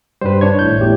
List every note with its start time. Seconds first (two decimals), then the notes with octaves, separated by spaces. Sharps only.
0.21 G2 G3 B4 C5
0.41 D4 C#5 G#6
0.59 G#1 A2 G6
0.80 E2 A2 G4